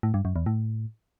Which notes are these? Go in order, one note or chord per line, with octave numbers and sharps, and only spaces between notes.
A2
G2
F#2
E2
A2